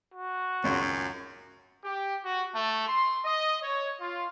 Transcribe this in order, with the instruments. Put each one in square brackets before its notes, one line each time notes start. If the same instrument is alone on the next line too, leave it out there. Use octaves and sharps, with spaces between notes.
[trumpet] F#4
[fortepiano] G#1 C#2 C6 [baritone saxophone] F#2
[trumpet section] G4
F#4
A3
C6
D#5
C#5
F4